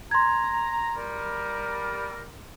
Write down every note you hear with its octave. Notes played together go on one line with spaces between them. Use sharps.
A#5 C6 G#6
G3 A#4